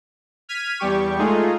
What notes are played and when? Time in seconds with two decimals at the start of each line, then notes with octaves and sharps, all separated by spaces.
0.49 F6 G#6 B6 D#7
0.80 E2 G3 G4 C#6
1.18 G#3 A3 D#4 F4 G#4